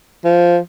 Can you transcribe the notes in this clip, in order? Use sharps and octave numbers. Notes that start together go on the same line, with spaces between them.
F3